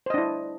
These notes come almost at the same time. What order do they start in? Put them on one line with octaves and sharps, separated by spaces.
C5 D#5 D4 E4